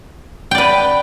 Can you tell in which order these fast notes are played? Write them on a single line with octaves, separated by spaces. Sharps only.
G5 D5 B4